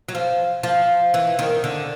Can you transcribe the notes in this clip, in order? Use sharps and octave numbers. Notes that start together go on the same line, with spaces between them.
F#3
F3
F3
E3
D#3
D3